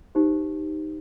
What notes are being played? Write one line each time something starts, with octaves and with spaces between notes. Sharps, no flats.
D#4 G4 C5